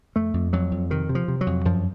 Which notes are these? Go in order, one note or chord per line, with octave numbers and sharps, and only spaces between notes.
F2 A3
F2
F2 F#3
F2
C3 D#3
C3
F3
C3
F#3
F2
F#2 F3